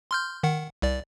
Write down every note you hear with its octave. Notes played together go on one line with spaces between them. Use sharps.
C6 F6 G6
D#3 F#5
C2 D5